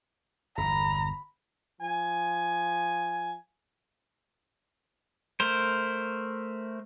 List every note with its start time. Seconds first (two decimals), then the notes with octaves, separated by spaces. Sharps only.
0.58 G1 E2 A#5 B5
1.81 F3 G#5
5.40 A3 A#4 C5